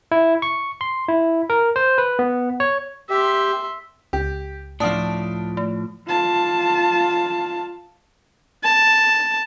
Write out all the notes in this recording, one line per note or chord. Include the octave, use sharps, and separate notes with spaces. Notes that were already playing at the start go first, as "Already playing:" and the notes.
E4
C#6
C6
E4
A#4
C5
B4
B3
C#5
G4 E5 C6
C#2 G4
A2 F3 D4 F4 A5 D#6 D7
A3
F4 A5
A5